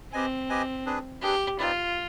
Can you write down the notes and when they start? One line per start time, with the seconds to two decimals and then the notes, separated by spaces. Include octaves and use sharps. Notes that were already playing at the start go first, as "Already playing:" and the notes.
0.13 C4 G4 B4 D#5 G#5
0.49 G4 B4 D#5 G#5
0.86 D4 G#4 B4
1.22 D4 G4 G#4 B4
1.59 C4 D#4 F4 B4 D5